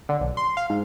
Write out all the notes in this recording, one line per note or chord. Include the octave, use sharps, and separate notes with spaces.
D3
B1
C6
F5
G#2